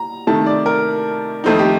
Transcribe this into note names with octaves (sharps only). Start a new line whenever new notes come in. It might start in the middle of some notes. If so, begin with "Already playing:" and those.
Already playing: A#5
C3 D#3 A3 A5
D5
A#4
F2 D#3 A3 C4 D#4
G4